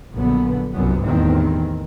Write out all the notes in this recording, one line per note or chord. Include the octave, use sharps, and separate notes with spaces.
A#1 F#2 D3 B3
G1 C2 F#2 B3
A1 E2 G2 D#3 C4